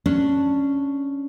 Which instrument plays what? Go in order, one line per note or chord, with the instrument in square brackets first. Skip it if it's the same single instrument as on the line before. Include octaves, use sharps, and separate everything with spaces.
[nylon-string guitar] C#4 D4